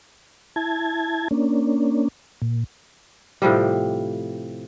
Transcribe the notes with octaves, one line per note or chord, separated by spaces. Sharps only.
E4 A5 G#6
A#3 C#4 D4
A#2
A2 C3 F3 G3